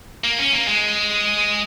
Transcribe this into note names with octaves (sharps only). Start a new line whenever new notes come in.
A#3
C#4
A#3
G#3